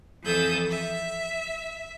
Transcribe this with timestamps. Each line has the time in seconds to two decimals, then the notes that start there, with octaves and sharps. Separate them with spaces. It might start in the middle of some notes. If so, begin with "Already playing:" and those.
0.22 F2 E3 A4 D#6 G6
0.69 E5